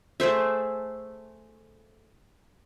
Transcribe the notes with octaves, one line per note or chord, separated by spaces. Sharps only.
A3 G#4 C5 E5